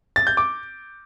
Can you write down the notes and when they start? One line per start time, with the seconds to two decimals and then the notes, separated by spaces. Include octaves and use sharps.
0.16 A6
0.27 G6
0.37 D6